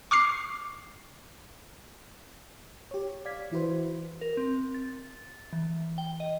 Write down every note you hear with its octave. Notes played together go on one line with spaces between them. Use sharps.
C#6 D6 F6 C7
G4 C#5
D5 F5 G#6 B6
E3 E4 F#4 B4 C5
A#4
C4
A6
E3
G5
D#5